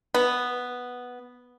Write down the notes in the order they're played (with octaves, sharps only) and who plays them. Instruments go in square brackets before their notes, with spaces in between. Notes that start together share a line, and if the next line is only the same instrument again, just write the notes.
[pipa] B3